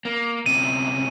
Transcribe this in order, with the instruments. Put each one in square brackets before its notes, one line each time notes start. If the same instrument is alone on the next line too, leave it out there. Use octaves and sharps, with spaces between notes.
[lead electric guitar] A#3
[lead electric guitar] D2 C3 [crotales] D#7